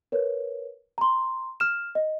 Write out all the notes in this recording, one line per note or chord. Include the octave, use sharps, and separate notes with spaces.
A#4 B4 C#5
A#5 C6
F6 E7
D#5